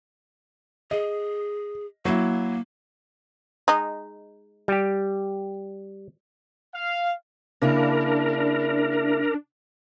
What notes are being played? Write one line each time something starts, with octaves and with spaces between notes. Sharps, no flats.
G#4 D#5
F#3 A#3 E4
G#3 D#4
G3 G4
F5
C#3 A#3 D4 E4 A#4